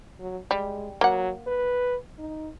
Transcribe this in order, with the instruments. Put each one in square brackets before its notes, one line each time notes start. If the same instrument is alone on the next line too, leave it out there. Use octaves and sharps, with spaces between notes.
[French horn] F#3
[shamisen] G3 [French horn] G#3
[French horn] F#3 [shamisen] A#3 F#5
[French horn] B4
D#4